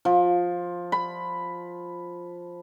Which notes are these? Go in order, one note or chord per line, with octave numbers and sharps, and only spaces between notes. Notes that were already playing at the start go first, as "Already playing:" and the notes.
F3
B5